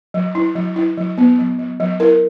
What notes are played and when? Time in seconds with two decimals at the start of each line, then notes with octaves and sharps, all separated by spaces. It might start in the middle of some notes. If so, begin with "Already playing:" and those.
0.14 F#3
0.35 E4
0.55 F#3
0.76 E4
0.97 F#3
1.18 B3
1.38 F#3
1.59 F#3
1.80 F#3
2.00 E4 A#4